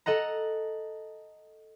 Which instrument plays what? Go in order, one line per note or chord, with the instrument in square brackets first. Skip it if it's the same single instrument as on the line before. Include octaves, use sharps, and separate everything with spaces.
[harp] A4 D#5 F#5 A#5